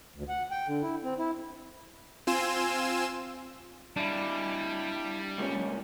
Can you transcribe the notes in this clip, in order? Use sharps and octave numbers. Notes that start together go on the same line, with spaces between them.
D2
F#5
G5
D3
E4
C4
E4
C4 F4 G#5 C6 E6 E7
G3 D4 E4
C#2 A#2 C#4